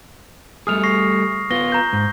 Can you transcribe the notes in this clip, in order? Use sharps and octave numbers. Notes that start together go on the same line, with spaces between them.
G3 A3 G#4 D#6 F6 F7
C#6 A#6 C7
B3 F4 A#6 G7
A#5 G6
G#2